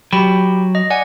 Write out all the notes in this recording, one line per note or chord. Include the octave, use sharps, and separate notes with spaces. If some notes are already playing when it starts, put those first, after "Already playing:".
F#3 G4 G5 B5
D#5
D5 F#5 G#5